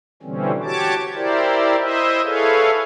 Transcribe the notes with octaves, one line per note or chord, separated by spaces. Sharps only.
B2 D3 E3 G3 C4 C#4
F#4 G4 C#5 A5 D6
E4 G4 A#4 C5 D5
E4 C5 D#5 E5
E4 G#4 A4 B4 C#5 F5